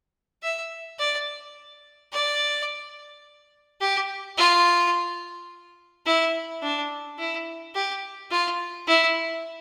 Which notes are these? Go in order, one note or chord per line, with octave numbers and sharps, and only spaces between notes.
E5
D5
D5
G4
F4
E4
D4
E4
G4
F4
E4